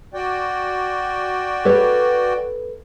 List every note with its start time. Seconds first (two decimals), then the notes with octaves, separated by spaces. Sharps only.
0.14 F#4 D5 G5
1.65 A4 B4 C#5